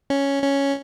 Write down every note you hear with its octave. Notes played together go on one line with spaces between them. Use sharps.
C#4
C#4